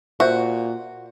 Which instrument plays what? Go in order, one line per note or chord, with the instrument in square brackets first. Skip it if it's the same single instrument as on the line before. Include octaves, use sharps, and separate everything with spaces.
[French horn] A#2 [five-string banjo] F#4 [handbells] C5 E5